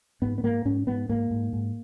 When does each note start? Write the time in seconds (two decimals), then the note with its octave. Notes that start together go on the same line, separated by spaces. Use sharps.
0.22 G#2 B3
0.38 B3
0.43 G#2 A#3
0.65 G#2 C#4
0.87 G#2 B3
1.09 G#2 A#3
1.31 G#2
1.53 G#2